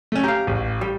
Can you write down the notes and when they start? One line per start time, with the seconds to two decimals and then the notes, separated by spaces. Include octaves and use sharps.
0.12 A3 C#4
0.24 G4 F5 A#5
0.47 A1
0.81 G3